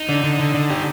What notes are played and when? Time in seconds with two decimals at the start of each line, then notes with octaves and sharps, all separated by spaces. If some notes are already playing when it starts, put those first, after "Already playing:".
Already playing: D#4
0.09 D3
0.23 D3
0.39 D3
0.54 D3
0.70 G4